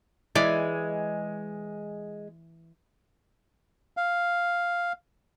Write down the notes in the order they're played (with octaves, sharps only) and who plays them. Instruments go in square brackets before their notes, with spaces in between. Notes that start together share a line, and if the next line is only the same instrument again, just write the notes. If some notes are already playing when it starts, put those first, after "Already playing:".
[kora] E3 [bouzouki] G#3 [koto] D5
[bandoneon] F5